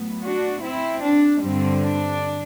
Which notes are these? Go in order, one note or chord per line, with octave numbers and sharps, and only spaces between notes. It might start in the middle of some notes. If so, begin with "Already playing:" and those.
Already playing: A2 F#3 B3
D4 F#4
C4 E4
D4
G2 D3 G3 C4
D4